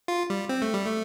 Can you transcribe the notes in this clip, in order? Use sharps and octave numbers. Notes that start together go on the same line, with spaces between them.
F4
G3
C4
A3
G3
A3